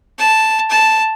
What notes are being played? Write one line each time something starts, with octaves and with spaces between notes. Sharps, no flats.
A5
A5